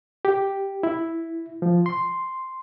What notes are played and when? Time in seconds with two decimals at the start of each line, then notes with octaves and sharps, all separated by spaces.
0.25 G4
0.83 E4
1.62 F3
1.86 C6